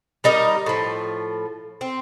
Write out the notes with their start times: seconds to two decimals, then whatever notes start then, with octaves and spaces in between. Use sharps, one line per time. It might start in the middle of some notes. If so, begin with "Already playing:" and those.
0.24 G3 D#4 A#4 D#5
0.66 A2 F3
1.81 C4